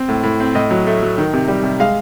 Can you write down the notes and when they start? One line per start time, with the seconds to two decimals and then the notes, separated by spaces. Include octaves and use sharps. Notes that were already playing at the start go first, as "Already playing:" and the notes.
Already playing: C4
0.08 A2
0.23 A2
0.40 C4
0.54 A2 D#5
0.71 F#3
0.87 A3
1.02 F#3
1.18 D#3
1.33 C3
1.48 G3
1.63 C3
1.80 G#3 F5